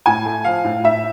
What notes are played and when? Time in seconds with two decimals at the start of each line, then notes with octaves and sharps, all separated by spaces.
0.06 A2 G#5
0.25 A3
0.44 F3 F5
0.64 A2
0.84 A2 E5